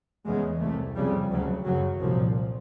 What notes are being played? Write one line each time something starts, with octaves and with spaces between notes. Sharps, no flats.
E2 C#3 G#3
C2 C3 A3
F2 C#3 G3
D2 C#3 F#3
F#2 C#3 F#3
C2 A#2 F3